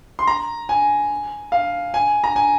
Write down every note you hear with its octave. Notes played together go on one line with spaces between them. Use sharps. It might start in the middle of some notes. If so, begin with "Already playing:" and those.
C6
A#5
G#5
F5
G#5
A#5
G#5